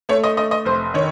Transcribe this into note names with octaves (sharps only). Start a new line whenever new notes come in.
A3 C#5
D#5
A3 D#5
D#5
F1 C5
D#3 C#5